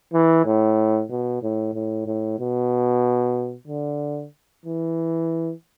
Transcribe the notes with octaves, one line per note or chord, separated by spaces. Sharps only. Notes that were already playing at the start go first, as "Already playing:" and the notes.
E3
A2
B2
A2
A2
A2
B2
D3
E3